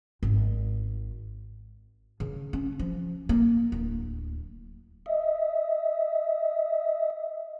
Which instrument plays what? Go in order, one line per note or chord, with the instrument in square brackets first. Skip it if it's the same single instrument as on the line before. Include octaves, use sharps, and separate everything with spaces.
[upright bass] G#1
C#3
C#4
F3
A#3
D1
[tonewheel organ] D#5 E5